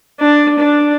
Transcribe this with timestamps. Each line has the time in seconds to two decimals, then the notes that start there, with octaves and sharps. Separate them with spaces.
0.20 D4
0.59 D4